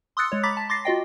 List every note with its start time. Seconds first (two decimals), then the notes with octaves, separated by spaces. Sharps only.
0.17 C6 D#6 E6 F#6 A6 C#7
0.32 G#3 C#5
0.43 A#5 B5 D6 A6 B6
0.57 A5
0.69 C6 D6 A6 A#6 C7
0.85 F4 F#4 D#5 G5